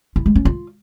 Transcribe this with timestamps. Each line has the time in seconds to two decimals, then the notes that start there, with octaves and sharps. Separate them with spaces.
0.16 E4
0.26 G#3
0.36 C#4
0.45 F4